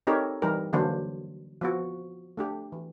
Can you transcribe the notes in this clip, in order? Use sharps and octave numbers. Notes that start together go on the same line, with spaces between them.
C4 D#4 G4 A4 A#4 C#5
E3 G3 D#4 G4 A#4
D3 E3 F#3 A#3 D4 C5
F3 B3 F#4
A3 D4 G4
E3